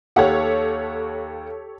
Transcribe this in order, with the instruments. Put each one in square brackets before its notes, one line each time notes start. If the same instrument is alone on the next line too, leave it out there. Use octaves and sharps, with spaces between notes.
[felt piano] D#2 F5 F#5 [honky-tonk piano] G4 A4 C#5